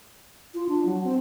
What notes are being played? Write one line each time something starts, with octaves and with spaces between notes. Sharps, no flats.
F4
D4
F#3
C4